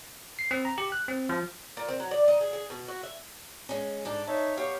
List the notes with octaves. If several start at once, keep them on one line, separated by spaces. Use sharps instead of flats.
C7
C4
A#5
G4
F#6
C4
F3
A#2
C4
F#3
D5
D#4
G#4
G#4
B2
F#4
E5
G#3 C#4
G#2 D4 A4
D#4 C#5 E5 A5
B3 G4 C#5 F5 C#6